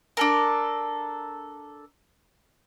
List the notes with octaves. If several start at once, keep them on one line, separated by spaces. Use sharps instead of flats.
D4 A4 A#4